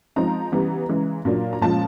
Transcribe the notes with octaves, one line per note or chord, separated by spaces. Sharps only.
F3 G#3 C4 D#4 A#5
C#3 E3 G3 B3
C#3 E3 G#3
A#2 F#3 A#3 D4
A#5
A#2 F3 G#3 C#4 A5